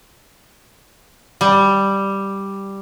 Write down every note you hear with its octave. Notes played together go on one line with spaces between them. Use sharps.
G3